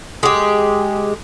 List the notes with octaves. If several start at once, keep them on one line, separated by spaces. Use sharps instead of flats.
G#3 G4